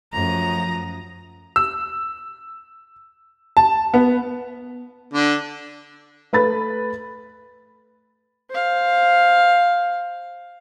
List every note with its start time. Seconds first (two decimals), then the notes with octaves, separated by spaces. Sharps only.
0.13 F#2 F3 A3 A#5 D#6 A#6
1.56 E6
3.57 A5
3.94 B3
5.14 D3
6.33 A3 B4 B5 A6
8.50 C5 F5